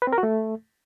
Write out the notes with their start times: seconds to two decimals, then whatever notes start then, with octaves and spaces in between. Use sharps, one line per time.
0.02 B4
0.07 C4
0.13 A#4
0.18 F#4
0.23 A3